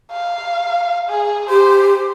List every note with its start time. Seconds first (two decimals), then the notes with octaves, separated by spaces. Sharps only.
0.12 F5
1.09 G#4
1.50 G4 C5